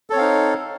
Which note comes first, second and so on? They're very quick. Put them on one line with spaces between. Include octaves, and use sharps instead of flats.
A4 C#5 C4 F5 D#4